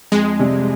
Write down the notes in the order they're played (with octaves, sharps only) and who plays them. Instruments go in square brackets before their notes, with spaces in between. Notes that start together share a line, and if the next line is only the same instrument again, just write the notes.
[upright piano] F2 [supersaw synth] G#3
[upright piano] C3 G3